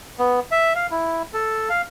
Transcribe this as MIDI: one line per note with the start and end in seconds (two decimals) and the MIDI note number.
0.19 0.40 59
0.51 0.73 76
0.75 0.87 77
0.91 1.22 64
1.33 1.69 69
1.70 1.82 77